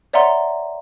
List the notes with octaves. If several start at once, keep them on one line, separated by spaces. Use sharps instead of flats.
C#5 D5 E5 F#5 A#5 C6